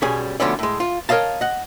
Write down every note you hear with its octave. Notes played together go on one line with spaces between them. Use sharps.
B1 G3 C#4 G#4 G#5
D2 D3 F3 B3 C#4 D5
A2 G#3
F4
A#4 C#5 D#5 F5 A5
D#5 F#5